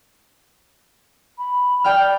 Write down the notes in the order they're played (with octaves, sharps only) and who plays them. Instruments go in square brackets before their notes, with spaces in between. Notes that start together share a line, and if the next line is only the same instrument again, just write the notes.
[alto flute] B5
[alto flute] D5 [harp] G5 F6